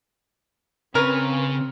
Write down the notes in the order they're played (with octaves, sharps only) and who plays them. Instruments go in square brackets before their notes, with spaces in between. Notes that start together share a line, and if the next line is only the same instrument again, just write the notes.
[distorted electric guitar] C#3 G#5 [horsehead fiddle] C4 [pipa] A#4 [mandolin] B4 C#5